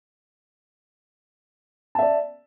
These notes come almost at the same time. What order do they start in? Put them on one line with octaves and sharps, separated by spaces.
A5 E5 D5